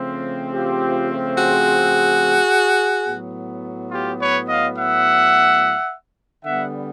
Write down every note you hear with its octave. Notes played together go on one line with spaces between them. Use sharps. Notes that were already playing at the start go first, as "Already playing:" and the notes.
Already playing: C#3 F3 A3 C4
F4 G4
F#4 G#4
A2 F#3 B3
F4 G4
B4 C#5
D#5 F5
E5 F#5
D3 G3 B3 E5 F#5